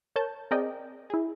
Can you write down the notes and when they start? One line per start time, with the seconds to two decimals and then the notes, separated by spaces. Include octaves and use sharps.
0.16 A#4 C#5 A5 G6
0.51 C4 G#4 A#4 D5 D#5 G5
1.10 E4 G#4